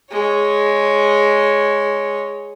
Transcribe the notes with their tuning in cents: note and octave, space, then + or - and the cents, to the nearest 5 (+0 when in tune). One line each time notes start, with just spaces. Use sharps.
G#3 +0 C#5 +0